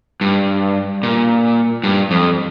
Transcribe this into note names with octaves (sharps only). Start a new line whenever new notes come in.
G2
A#2
G2
F2